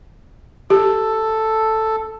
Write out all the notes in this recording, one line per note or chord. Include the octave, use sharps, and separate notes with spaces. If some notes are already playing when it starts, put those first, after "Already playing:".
G4 A4